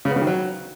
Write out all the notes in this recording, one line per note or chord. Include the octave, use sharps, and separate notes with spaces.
C#3
B3
C#3
D#3
F#3